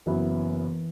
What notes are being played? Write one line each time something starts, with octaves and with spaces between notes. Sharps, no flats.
F#1 F#2 E3 F#3 B3 E4